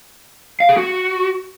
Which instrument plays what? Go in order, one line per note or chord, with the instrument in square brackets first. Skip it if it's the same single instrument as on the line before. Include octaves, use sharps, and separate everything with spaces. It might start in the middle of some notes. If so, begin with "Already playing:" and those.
[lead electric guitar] F5
G#4
F#4